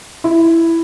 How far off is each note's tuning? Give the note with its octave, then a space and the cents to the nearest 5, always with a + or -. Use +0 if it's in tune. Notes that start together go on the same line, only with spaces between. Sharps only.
E4 +5